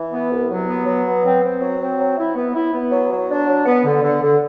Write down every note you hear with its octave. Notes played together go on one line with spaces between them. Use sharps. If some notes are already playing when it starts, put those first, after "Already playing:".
Already playing: E3
B3
C2
F#3
B3
F#3
B3
C4
C4
F#3
C4
F#3
E4
B3
E4
B3
F#3
F#3
D4
F#3
B3
D3
D3
D3